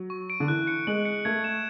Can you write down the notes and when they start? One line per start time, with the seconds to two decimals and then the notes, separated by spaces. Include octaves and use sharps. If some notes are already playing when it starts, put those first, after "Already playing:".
Already playing: F#3
0.10 C#6
0.30 D7
0.40 D3
0.48 E3 F#6
0.67 C#7
0.87 G#3 F#7
1.05 C#7
1.25 A3 G#6
1.44 E7